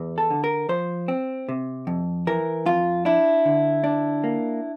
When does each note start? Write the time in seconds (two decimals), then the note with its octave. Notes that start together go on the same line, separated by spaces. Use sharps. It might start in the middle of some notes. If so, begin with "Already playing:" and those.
Already playing: E2
0.18 A4
0.30 D3
0.44 A#4
0.69 F3 C5
1.08 C4
1.49 C3
1.87 F2
2.27 E3 A#4
2.66 F2 F4
3.05 D4 E4
3.45 D3
3.84 D4
4.24 A#3